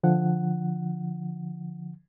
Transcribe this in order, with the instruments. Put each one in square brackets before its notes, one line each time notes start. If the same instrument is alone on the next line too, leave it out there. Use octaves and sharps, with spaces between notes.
[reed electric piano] D3 F3 F#5